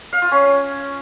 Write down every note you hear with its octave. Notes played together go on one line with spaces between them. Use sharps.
F5
F4
C#4